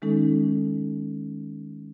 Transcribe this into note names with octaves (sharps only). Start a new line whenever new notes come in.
D#3 G#3 C#4 D#4 A4